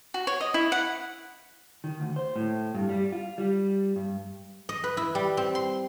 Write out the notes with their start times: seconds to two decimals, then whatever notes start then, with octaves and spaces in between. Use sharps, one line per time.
0.14 F#4
0.27 C#5
0.41 D#5
0.54 E4
0.72 F#5
1.84 D#3
2.00 D2
2.16 C5
2.36 A2
2.74 G2
2.89 G3
3.12 F4
3.38 G3
3.96 G2
4.69 D#5
4.84 B4
4.97 E4
5.15 G3
5.37 C4
5.55 C6